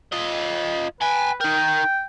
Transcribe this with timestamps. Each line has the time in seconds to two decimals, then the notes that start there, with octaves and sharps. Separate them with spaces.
0.12 F4 D#5
1.01 B4 G5 G#5
1.41 D#4 A#4 G5